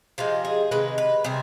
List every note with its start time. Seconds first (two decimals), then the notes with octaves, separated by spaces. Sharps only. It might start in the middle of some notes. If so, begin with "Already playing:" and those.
0.18 C3 F3 G#3 F4
0.45 G#4
0.71 C3 D#3 G#3 B4
0.98 B4
1.24 C3 G3 G#4